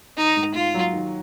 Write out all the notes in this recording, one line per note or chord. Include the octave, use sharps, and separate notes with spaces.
D#3 D#4
G#2
G#2 F4
F#3
D#3